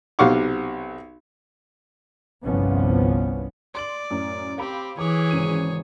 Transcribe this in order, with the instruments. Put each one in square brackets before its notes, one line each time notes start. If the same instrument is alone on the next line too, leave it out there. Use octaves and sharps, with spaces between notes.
[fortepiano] B1 C3 F5 F#5 C#6 D6
[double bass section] G1 C2 G2 F3 B3 C#4
[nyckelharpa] D5 [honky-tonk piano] C6 F#7
[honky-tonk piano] F#2 A2
[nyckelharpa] C4 G4 [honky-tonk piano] F5 B5 D6
[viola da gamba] E3 [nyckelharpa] G#4 C#5 [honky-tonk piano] D6
[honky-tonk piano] G#1 C#3 D#7